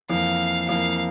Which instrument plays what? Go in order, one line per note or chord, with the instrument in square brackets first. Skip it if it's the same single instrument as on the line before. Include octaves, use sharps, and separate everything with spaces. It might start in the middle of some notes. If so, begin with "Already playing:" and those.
[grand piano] F2 E3 A#3 [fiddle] F5
[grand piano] F2 E3 A#3 [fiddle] F5